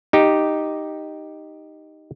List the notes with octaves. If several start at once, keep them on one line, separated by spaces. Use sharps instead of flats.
D#4 G4